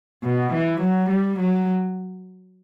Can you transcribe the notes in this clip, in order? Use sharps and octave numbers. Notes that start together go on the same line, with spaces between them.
B2
E3
F#3
G3
F#3